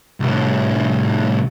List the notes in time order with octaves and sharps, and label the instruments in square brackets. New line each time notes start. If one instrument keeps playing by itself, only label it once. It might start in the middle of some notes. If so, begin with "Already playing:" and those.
[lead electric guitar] C2 A2